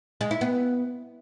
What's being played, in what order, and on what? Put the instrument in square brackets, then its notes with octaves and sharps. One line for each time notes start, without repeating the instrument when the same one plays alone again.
[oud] G#3
E4
B3